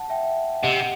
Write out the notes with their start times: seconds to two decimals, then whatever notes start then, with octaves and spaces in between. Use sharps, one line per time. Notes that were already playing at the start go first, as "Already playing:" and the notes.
Already playing: F#5 A5
0.10 E5 G5
0.63 C3 D#5 F#5